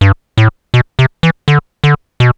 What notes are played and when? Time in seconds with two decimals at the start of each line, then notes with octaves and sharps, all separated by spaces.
0.01 G2
0.38 A2
0.74 B2
0.99 C3
1.23 E3
1.48 D3
1.84 D3
2.20 B2